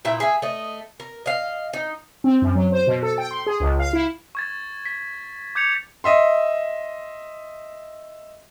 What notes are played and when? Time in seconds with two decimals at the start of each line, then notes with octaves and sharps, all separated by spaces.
0.05 A#2 E4 E5 G5
0.20 G#4 E5
0.42 A3 D#5
1.00 A#4
1.26 D#5 F5
1.73 D#4
2.24 C4
2.42 F#2
2.55 F#3
2.72 C5
2.87 B2
3.03 A4
3.18 G5
3.31 C6
3.46 G#4
3.60 C#2
3.79 F5
3.93 E4
4.35 C#6 G#6 A6
4.85 B6
5.55 D6 G6 G#6 C#7 F7
6.04 D#5 E5 C6